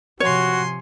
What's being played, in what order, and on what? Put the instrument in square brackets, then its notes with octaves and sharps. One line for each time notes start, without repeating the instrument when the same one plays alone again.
[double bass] C3 F3 [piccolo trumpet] F#4 [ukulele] C#5 [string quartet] G#5 C6